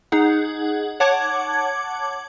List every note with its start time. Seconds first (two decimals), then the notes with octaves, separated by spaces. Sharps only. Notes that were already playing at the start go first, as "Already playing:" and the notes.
0.12 D#4 G#4 F#5
1.00 C#5 F#5 A5 D6 G#6